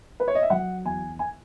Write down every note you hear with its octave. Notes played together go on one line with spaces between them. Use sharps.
B4
C#5
D#5
E5
F#3 F#5
E2 G#5
G#5